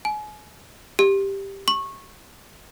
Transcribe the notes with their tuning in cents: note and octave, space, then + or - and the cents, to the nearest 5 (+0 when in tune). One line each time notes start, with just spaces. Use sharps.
G#5 +30
G4 +5
C#6 -20